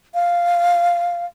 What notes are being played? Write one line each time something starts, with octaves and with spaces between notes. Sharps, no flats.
F5